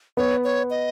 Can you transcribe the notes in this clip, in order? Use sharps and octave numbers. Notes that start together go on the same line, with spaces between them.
B3 C#5
C#5
D#5